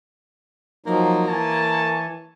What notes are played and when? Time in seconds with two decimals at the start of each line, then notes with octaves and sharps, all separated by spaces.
0.86 F3 F#3 A#3 D#4
1.28 E3 C#5 G#5 A5